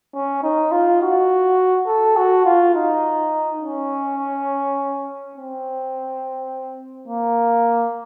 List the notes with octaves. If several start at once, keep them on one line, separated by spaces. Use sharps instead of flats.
C#4
D#4
F4
F#4
A4
F#4
F4
D#4
C#4
C4
A#3